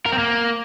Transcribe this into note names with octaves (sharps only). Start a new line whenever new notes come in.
A#4
C4
A#3